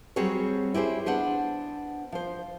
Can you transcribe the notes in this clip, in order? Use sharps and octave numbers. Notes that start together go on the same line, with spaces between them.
F#3 G3 C4 F#4 G#4 C#5
E4 G4 G#4 C5
B3 D4 C5 F#5
F3 C5